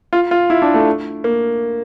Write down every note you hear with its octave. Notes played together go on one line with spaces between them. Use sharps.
F4
F4
E4
D4
A3
A#3